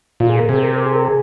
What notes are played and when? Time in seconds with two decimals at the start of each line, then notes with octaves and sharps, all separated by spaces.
0.20 A#2 F4
0.30 G#4
0.39 A#4
0.49 C3 G#4
0.63 A#4
0.76 A#4
0.86 G#4
0.96 A#4
1.05 G#4